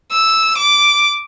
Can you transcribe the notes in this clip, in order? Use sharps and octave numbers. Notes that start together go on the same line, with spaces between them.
E6
D6